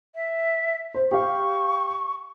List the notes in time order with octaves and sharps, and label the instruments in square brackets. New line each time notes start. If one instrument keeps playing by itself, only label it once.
[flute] E5
[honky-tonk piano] C5
[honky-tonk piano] G4 F5 [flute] C#6